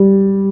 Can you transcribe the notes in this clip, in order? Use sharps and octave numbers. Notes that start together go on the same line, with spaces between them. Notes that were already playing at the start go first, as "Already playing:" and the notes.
Already playing: G3